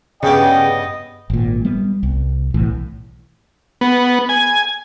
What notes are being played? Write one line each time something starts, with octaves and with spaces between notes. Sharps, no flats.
G2 C#3 B3 D5 D#5 G5
G#1 A#2
G3 B3
C2
B1 A2 E3
B3
G#5